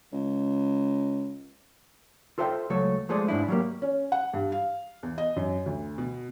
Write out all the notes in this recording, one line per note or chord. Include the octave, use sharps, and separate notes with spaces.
C#2
F4 A4 C5 E5 F5 G5
C#2 F#3 A3 A4 C#5
F3 G#3 A3 G#4 C5 D5
G#2 D4 E4
F#3 G3 A#3
C#4
F#5
G2
F5
E2
D#5
F#2
D2
B2